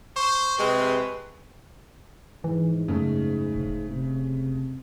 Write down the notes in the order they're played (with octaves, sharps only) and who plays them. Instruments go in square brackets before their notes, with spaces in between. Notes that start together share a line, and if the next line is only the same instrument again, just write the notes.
[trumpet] C5 [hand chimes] C#6
[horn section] C3 G#3 [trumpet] C4 [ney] B4
[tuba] G#2 [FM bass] E3
[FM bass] F#2 [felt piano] C#3 G#3 A3
[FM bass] E1
[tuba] C3